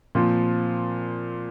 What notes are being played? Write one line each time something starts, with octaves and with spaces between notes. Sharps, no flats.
A#2 F3 C4